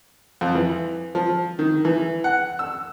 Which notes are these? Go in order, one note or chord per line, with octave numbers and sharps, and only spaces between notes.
F2
E3
F3
D#3
E3
F#5
E6